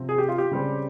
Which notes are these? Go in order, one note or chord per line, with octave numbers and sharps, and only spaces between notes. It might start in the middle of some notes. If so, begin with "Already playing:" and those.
Already playing: C3 F3 C4
G#4
G4
F4
G4
C#3 G3 C4